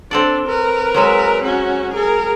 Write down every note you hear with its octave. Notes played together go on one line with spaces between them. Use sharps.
C4 D4 A4 D5
A#4 B4
F#3 G#3 E5
C#4 F#4
G#4 A#4